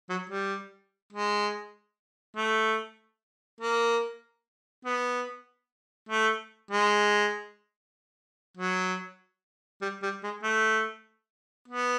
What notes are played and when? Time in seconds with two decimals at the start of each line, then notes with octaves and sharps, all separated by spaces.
0.09 F#3
0.29 G3
1.12 G#3
2.36 A3
3.60 A#3
4.85 B3
6.09 A3
6.71 G#3
8.57 F#3
9.82 G3
10.02 G3
10.23 G#3
10.43 A3
11.68 B3